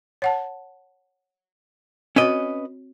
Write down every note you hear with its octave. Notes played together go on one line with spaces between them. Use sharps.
C#5 F#5 A5
C4 C#4 F#4 B4 C#5 D#5